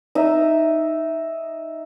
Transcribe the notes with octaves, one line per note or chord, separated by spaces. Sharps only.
D#4 E5